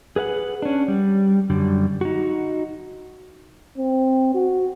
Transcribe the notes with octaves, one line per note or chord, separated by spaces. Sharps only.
G#4 B4 F5 F#5
C#4 D4
G3
F#2 D3 G3
D#4 F#4
C4
F#4